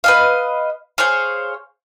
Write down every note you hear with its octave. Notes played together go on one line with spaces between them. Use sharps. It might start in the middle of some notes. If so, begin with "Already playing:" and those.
B4 D#5 F5
G#4 C5 C#5 F5